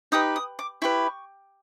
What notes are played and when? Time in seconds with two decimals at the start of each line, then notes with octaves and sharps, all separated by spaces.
0.12 D#4 G4 B4 D#6
0.36 D#6
0.59 D6
0.82 E4 G4 B4 C#6